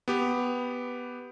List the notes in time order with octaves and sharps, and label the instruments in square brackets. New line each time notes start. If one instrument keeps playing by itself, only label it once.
[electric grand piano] B3 G4